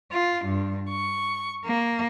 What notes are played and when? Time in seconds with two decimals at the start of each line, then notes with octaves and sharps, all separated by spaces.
0.12 F4
0.45 G2
0.89 C#6
1.65 A#3